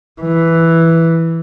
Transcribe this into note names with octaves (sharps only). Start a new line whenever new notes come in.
E3